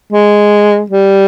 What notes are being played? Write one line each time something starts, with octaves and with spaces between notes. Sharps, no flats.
G#3
G3